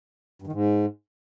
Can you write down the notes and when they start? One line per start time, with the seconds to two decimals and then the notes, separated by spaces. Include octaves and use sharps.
0.42 G2
0.47 D#3
0.52 G#2